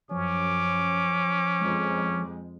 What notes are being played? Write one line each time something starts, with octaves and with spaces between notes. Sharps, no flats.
F#2 F3 C#4 D6
F2 G#3